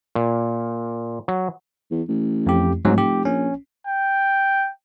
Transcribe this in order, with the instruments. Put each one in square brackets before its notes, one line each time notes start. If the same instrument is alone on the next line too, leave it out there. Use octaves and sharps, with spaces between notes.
[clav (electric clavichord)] A#2
F#3
[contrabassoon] E2
A1
[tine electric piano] F2 G4
[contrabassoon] F1 [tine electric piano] G#2 F#3
[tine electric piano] G4
[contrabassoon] A#1 [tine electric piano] C#4
[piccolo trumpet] G5